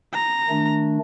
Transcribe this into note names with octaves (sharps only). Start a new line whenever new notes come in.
A#5
D#3 A3 D4